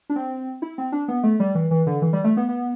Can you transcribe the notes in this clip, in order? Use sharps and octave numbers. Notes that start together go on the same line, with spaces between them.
D4
C4
E4
C4
D4
B3
A3
G3
E3
E3
D3
E3
G3
A3
B3
B3